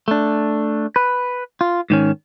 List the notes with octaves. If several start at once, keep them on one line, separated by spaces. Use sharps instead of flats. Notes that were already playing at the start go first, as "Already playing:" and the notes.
A3 D4
B4
F4
G#2 D#3 C#4